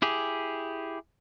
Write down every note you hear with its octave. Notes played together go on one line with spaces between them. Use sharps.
E4 G4 G#4